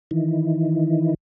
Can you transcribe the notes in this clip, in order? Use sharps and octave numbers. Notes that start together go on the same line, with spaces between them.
D#3 E3